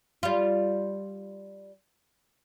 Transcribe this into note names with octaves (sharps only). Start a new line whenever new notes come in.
G3 F4